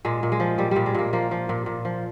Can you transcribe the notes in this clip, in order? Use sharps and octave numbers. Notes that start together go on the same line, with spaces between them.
A#2 G#3
A#2
G#3
F3
A#2 G3
A#2 G3
G#3
A#2 A#3
F3 A#3
F3
A#2
A#2
F3